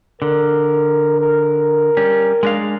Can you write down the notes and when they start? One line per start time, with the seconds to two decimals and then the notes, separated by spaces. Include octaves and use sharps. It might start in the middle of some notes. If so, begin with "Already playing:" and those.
0.22 D3 A#4
1.20 A#4
1.97 G3 C#4
2.43 G#3 D4 F5